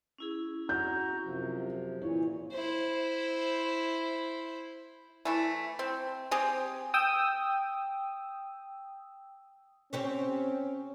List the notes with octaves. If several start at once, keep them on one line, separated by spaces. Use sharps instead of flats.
C#4 E4 G#4
F#4 A#5 G6
F#2 C3 F3
A#2 E3 E4 C#5
E4 C5
E3 A3 E4
C4
C4 G4 G#4
G5 D#6 E6
C4 C#4 G4 C#5